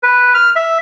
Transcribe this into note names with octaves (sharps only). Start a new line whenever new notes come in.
B4
F6
E5